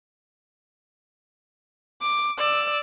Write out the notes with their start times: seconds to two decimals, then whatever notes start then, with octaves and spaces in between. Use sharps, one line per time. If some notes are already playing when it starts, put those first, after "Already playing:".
2.02 D6
2.38 D5 E6